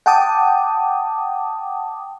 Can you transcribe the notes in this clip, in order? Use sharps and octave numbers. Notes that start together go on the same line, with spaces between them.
F#5 G5 A5 D6 D#6